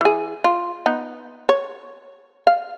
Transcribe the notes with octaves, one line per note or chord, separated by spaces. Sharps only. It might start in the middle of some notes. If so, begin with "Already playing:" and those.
E3 G#4
F4
B3 D#4
C#5
F5